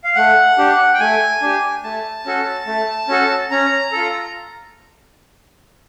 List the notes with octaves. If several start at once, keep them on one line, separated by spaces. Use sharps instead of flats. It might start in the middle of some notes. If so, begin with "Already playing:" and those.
F5
A3 F#5
D4 G4
G5
A3 G#5
D4 G4
A3 A5
C#4 F#4 A4
A3
C#4 F#4 A4
C#4 A#5
F4 A4